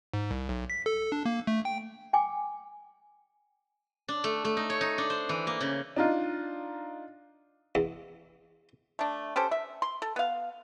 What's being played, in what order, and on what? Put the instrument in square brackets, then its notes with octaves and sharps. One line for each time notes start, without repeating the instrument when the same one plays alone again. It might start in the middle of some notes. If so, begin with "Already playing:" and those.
[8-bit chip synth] G#2
C2
B1
B6
A4
D4
A#3
A3
G5
[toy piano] G5 G#5 D6
[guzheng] D4
A3
A3
D#4
C#5
D#4
D4
C5
E3
A#3
C#3
[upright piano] D4 D#4 F4
[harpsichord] E2
[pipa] A3 D4
C#4 G4 A4 C5
E5
C6
A4
B3 F5